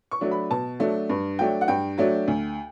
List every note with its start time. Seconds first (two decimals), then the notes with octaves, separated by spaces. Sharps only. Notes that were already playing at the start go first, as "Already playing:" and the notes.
0.11 C#6
0.21 F#3 A3 D4
0.31 B5
0.50 B2 A5
0.80 F#3 A3 D4
1.09 G2
1.39 F#3 A3 D4 G5
1.61 F#5
1.68 G2 G5
1.98 F#3 A3 D4
2.28 D2